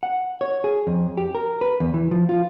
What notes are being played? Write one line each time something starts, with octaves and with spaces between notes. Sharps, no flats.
F#5
C#5
G#4
F2
G4
A#4
B4
E2
E3
F3
F4